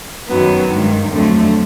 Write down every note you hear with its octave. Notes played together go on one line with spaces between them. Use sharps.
F#2 D#3 F#3 B3
G2 D#3 G#3
F2 D3 F#3 A3